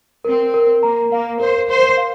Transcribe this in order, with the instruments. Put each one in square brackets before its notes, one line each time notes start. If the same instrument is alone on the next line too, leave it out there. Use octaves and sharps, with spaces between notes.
[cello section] C4 [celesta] A#4
[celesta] A#4
[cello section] A#3 [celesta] A#5
[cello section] A#3 [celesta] F5
[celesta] A#4 [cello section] C5
[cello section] C5 [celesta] C6
[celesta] F5